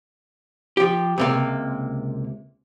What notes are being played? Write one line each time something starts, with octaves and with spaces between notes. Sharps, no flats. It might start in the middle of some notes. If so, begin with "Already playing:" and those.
F3 G4
C#2 C3 A#3